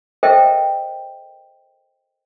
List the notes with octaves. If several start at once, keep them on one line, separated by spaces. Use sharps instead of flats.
A4 A#4 C5 D#5 E5 G5